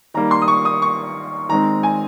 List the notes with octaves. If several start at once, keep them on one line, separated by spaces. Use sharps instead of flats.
D#3 G3 A#3 A#5
C6
D#6
C#6
D#6
C#6
D#3 G#3 C4 A#5
G#5